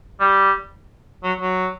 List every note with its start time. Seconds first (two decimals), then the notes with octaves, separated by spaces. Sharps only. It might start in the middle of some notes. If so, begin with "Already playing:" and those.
0.20 G3
1.24 F#3
1.41 F#3